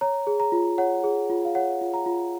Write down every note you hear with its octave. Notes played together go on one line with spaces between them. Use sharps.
C#5 A#5
G#4
A#5
F4
C#5 F#5
G#4
F4
F5
C#5 F#5
F4
A#5
F4